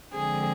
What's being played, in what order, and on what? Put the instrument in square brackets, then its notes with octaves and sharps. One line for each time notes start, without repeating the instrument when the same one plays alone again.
[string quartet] D3 F3 G#3 C4 G#4